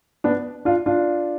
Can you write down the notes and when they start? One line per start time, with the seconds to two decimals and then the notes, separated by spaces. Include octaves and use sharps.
0.24 B3 D4
0.65 D4 F4
0.86 D4 F4